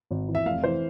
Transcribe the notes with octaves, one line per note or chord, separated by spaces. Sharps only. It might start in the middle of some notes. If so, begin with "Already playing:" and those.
G#1
E3
E5
F1 F5
E3 C5